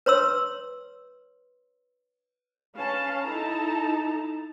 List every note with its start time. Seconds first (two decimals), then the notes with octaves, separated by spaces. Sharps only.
0.06 B4 C#5 C6 E6
2.75 C#4 B4 F5 A5
3.24 D#4 E4 A4 A5 A#5